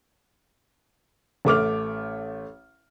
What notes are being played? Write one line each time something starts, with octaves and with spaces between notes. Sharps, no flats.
A1 A3 D6 F6